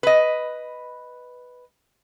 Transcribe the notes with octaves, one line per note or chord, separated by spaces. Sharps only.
B4 D#5